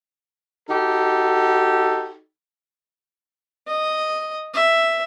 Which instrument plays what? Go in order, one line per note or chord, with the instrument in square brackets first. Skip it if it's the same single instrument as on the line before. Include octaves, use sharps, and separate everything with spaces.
[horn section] D#4 F#4 G4 A4
[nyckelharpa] D#5
E5